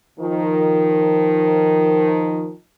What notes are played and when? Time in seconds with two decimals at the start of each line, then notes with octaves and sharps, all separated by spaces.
0.19 D#3 F3